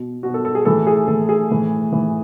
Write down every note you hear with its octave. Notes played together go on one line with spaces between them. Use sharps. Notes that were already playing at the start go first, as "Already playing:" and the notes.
Already playing: B2
B2 F#4
A4
A4
G#4
A2 E3 A4
G#4
A2 E3 A4
G#4
A2 E3
A2 E3